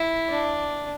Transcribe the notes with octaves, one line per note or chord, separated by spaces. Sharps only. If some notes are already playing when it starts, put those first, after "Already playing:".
Already playing: E4
D4